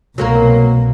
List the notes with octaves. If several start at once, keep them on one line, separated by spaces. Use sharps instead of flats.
C2 B2 F#3 A#3 A#4